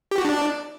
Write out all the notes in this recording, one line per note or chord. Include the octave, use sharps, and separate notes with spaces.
G4
F#4
D4